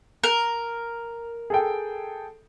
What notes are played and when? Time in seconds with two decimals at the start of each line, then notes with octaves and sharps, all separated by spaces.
0.24 A#4
1.50 G#4 A4 G5